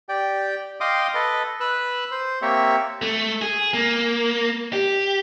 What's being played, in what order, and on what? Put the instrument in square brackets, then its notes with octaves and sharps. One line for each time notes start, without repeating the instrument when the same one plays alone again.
[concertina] G4 D5 G5
D#5 F5 G5 C6 D6 D#6
A4 B4 D#5
B4 E6 F#6
C5
A#3 C4 G4 C#5 E5
[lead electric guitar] A3
G#4
A#3
G4